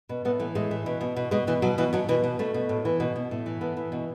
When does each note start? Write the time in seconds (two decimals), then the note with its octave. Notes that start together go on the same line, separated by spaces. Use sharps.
0.09 B2
0.25 A2 B3
0.40 E3 A3
0.55 A2 G#3
0.71 E3
0.86 B2
1.01 B2
1.16 B2
1.31 B2 G#3
1.47 B2 E3
1.62 B2 F#3
1.78 B2 E3
1.93 B2 F#3
2.09 B2 E3
2.24 B2
2.39 B2 A3
2.54 B2
2.69 A2
2.85 E3
3.00 B2
3.16 B2
3.31 A2
3.46 E3
3.61 A2 B3
3.77 E3
3.92 B2